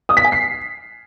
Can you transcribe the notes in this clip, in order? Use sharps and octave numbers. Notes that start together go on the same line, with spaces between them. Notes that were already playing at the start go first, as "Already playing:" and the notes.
D#6
B6
G#5
C7